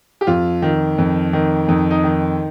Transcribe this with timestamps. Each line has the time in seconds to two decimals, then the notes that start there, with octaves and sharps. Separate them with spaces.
0.21 G4
0.27 F2 F4
0.62 D#3
0.98 F2
1.33 D#3
1.68 F2 D#4
1.91 D#4
2.04 D#3